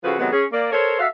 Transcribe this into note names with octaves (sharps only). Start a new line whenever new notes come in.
C#3 F3 F#4 G#4 A4 B4
C3 D#3 F#3 G#3 B3
C#4 G#4
A#3 D5
A4 A#4 C5 C#5
F#4 A4 E5 F5